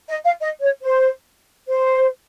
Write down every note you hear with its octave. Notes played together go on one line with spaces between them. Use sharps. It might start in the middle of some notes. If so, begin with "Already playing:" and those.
D#5
F5
D#5
C#5
C5
C5